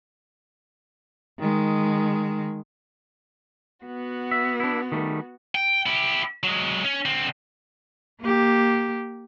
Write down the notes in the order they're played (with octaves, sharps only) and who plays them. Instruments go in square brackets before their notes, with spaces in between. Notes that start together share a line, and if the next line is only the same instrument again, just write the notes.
[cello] D#3 G#3
[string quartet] B3 F#4
[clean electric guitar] E5
D4 E4
D#3 G3 A3
[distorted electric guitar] G5
E4 G4
F#3 G#3
C#4
D3 C4
[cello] A#3 G4